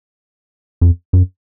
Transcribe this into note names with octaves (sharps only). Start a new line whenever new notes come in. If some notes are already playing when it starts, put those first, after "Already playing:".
F2
F#2